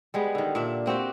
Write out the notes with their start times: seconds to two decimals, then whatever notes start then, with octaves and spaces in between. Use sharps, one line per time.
0.14 G3 G#3 B3
0.35 D3 D#3
0.55 A#2 D4 E5
0.86 A#3 C4 F#4 G4